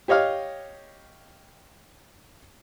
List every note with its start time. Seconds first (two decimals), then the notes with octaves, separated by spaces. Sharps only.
0.08 G4 C#5 D#5 F5 F6